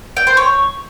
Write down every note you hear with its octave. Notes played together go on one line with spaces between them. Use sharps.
G5
C5
C#5